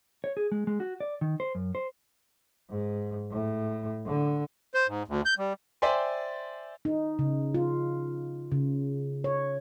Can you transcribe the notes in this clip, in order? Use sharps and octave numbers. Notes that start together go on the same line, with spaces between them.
C#5
G#4
G#3
G#3
F#4
D5
D#3
C5
F#2
C5
G#2
A2
D3
C5
G#2
D2
G6
G3
C5 D5 E5 G5 G#5 C6
D#4
C#3
F4
C#3
C#5